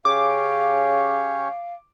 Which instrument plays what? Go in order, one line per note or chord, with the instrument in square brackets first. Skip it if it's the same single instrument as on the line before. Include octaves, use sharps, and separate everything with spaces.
[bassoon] C#3 [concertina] C#4 G4 C#5 [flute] F5 [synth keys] D6